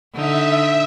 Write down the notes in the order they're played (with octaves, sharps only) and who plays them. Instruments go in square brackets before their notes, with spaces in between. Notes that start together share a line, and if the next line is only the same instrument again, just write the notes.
[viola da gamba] D3 D#4 [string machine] E5